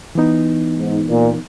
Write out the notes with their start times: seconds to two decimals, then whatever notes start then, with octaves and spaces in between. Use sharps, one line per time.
0.15 E3 B3 D#4
0.77 G#2
1.08 A#2